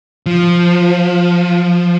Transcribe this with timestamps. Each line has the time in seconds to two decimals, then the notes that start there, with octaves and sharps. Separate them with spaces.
0.26 F3